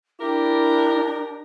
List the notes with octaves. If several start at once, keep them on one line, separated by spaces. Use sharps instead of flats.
D4 E4 G4 A#4